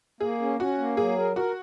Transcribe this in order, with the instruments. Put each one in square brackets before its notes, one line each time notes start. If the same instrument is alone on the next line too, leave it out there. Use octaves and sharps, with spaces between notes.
[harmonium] A#3 [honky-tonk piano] G#4
[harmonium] C#4
[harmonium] C#4 [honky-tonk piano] F#4
[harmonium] A#3
[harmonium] F#3 [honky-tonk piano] G#4
[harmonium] A#4
[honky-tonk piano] F#4 [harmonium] A#4